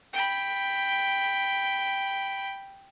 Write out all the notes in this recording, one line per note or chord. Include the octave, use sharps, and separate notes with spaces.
G5 B5